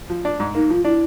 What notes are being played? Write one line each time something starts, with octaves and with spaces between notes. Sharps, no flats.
F3
D4
G#2
A#3 D#4
F3 F4
D4 E4